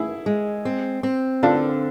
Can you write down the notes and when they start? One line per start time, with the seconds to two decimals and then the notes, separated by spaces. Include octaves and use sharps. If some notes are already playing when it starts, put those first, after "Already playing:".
Already playing: E4 G#4
0.26 G#3
0.65 C4
1.03 C4
1.43 D3 D4 F4